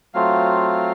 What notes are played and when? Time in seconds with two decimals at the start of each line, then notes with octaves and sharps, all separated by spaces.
0.14 F#3 A3 C4 F4 F5